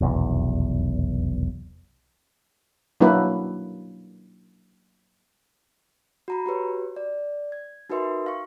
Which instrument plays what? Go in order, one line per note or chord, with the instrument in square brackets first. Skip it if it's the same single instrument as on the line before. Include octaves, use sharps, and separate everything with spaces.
[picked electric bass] F1 B1 E2
[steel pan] F#3 A#3 D4 E4 F#4 B4
[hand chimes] F#4 A#5 B5
F#4 G4 B4 C#5
D5
G#6
D#4 F#4 A#4 B4 E5 C6
F5 C#6